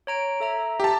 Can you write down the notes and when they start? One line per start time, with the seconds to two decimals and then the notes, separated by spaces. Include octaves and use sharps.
0.07 C#5 A#5 D7
0.40 A4 E5 A#5
0.80 G4 A5